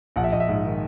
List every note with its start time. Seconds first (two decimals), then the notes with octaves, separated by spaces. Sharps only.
0.16 A#1 F#5
0.24 E5
0.32 A#1 D#5
0.40 E5
0.49 G#2
0.65 D#3